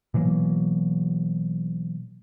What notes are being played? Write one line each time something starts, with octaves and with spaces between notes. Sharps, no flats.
B2 E3 F#3 A#3